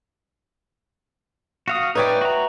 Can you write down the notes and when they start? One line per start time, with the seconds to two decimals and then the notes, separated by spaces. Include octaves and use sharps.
1.68 F#4 F5 D#6
1.95 D#4 B4 C#5 D5 E5 G5
2.21 F#4 A#5